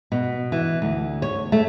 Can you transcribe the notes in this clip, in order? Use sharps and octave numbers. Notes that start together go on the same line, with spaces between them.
B2
E3
D2
C#5
A3